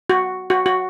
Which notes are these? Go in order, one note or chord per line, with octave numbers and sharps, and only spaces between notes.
F#4
F#4
F#4